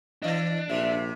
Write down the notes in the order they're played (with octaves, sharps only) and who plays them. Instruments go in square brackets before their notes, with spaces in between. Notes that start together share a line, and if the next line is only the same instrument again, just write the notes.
[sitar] E3 D#5 [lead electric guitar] D4
[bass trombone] A#1 [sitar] C3 [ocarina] E5